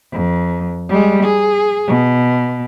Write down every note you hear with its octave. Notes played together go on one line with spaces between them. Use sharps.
F2
G3 G#3
G#4
B2